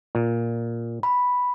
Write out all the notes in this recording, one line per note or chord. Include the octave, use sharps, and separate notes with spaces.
A#2
B5